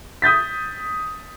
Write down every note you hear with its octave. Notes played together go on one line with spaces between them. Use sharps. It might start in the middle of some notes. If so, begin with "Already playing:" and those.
D#6 G6 A6 B6